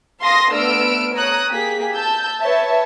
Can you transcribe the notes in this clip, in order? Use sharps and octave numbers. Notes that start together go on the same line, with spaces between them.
F5 A5 C6 D#6 A#6
A3 B3 D4 E6 F6 D7
C#5 A#5 D#6 F#6
A#3 G4 G#4 B6
A5 E6 G6
B4 C#5 E5 A5